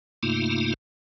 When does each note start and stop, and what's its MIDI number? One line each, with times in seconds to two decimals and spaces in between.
0.23 0.74 43
0.23 0.74 48
0.23 0.74 57
0.23 0.74 58
0.23 0.74 63
0.23 0.74 65